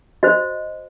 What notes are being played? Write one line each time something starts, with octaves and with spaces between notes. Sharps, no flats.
F#4 C5 D#5